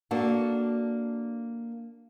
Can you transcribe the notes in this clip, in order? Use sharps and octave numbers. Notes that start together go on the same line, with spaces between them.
A#3 D4 F#4 A4